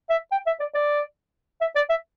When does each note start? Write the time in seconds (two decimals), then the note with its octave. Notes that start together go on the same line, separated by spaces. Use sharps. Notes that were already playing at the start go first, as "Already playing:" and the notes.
0.10 E5
0.32 G5
0.46 E5
0.60 D5
0.75 D5
1.61 E5
1.75 D5
1.90 E5